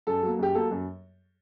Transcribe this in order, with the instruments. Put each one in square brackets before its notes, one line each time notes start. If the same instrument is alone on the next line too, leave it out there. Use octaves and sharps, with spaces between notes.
[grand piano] F#2 A4
F#3 A#3
F#2 G4
F#3 A#3 A4
F#2